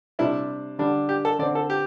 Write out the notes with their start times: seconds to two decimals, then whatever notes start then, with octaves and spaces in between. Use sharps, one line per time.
0.19 C3 G3 D4 E4
0.79 D3 G3 D4
1.09 G4
1.25 A4
1.39 D3 D5
1.42 C4
1.55 A4
1.70 G4